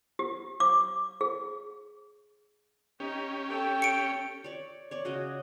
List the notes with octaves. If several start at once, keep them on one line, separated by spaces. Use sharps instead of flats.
G4
D6
G#4
C#4 D#4 G4
A4 G5
C#7 D7
C#5 D5
C#5 D5
C#3 F#4 D#5